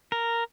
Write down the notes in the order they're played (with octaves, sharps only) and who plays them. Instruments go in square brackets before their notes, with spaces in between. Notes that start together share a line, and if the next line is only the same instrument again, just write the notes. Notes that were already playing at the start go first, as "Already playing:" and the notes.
[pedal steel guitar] A#4